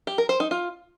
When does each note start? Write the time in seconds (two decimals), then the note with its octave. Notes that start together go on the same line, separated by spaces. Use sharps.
0.07 G4
0.18 A#4
0.29 C5
0.40 D#4
0.51 F4